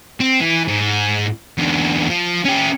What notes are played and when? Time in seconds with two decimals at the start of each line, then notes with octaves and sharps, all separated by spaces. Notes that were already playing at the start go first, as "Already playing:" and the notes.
0.20 C4
0.41 E3
0.68 G#2
1.58 E2 D3
2.10 F3
2.45 C#4 G4